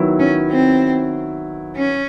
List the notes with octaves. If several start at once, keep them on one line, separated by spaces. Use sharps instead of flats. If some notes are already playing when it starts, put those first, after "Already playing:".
Already playing: D#3 F#3 B3 E4
C#4
C4
C#4